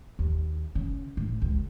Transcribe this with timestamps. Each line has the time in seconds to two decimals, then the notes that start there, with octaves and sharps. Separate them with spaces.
0.19 D#2
0.75 C#3
1.17 A2
1.42 C#2